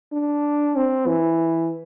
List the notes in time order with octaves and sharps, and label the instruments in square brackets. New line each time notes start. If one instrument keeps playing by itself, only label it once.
[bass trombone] D4
C4
E3